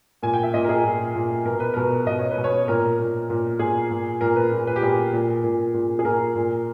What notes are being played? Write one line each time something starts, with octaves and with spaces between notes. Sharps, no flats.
A#2 G#5
G5
E5
A#2 D#5
A#4
G#4
A#2
A#2
B2 A#4
B4
B2 A#4
B2 D#5
C#5
B4
B2
C#5
A#2 A#4
A#2
A#2
A#2 G#4
A#2
A#2 A#4
B4
A#2
B4
G4
A#2 G#4
A#2
A#2
A#2
G#4
A#2 A#4
A#2